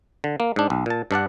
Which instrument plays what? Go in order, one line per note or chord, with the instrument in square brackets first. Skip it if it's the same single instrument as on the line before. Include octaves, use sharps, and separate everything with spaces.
[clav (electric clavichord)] D3
A#3
G#2 D4
B1
A#2 A5
G2 D4 D5 F#5